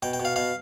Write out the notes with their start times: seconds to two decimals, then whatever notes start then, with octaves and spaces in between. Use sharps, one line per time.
0.02 B2 G5
0.13 G5
0.20 B2
0.25 F5
0.36 B2 F5